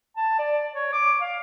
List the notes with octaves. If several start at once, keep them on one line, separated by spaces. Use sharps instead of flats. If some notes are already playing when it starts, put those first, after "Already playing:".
A5
D5
C#5
D6
F5